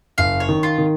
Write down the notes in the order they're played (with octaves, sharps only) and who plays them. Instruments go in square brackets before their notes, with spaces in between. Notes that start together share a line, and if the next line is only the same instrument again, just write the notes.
[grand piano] F#1 [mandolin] F5
[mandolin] C#5
[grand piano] D#3
[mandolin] F4
[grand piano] D#3